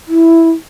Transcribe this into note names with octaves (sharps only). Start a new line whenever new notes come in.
E4